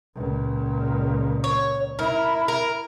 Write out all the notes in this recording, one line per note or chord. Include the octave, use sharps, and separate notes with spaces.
C#2 A#2
C#5
E4 A#4
A#4